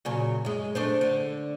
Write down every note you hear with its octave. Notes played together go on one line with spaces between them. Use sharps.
A#2 C#3 F#3
F#2 G#3
A3 D4 C5
D3